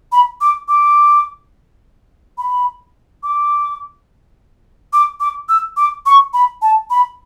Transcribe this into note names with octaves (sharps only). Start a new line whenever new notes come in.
B5
D6
D6
B5
D6
D6
D6
E6
D6
C#6
B5
A5
B5